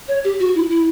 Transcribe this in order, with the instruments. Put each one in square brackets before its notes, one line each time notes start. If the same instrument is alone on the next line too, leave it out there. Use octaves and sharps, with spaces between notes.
[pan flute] C#5
G4
F#4
E4
E4